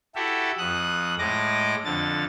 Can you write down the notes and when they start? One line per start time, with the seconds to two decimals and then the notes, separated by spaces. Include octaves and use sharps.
0.16 E4 F#4 G4 A4 E5
0.58 F2 D#6 F#6
1.19 A2 G#3 D#5 D6 A#6
1.85 F2 D3 A6